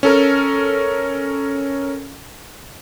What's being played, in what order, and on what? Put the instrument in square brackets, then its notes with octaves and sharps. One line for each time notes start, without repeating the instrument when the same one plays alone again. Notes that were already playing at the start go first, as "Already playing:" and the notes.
[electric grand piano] C#4 A4 A#4